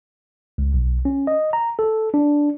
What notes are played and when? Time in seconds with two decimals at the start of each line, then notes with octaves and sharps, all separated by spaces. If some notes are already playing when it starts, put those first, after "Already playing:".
0.58 C#2
0.74 B1
1.05 C#4
1.27 D#5
1.53 A#5
1.79 A4
2.14 D4